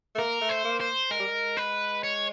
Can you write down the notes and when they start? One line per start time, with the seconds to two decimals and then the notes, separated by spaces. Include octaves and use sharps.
0.15 A3
0.18 A#3 A#4
0.41 A3
0.49 C5
0.65 A#3
0.80 C5
1.11 G#3 A#4
1.20 G3
1.28 G#3
1.57 B4
2.03 C#5